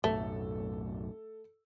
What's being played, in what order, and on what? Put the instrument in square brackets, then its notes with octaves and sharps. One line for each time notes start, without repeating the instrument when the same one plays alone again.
[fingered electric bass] B1 F#2 A2 [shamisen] A3 [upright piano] A4